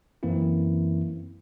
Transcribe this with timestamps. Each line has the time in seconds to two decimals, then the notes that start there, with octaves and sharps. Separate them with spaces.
0.23 F#2 E3 A#3 C4 E4